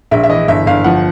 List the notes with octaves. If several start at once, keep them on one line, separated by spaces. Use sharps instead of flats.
A#1 E5
E5
E3 D#5
G1 E5
G1 F5
F3 F#5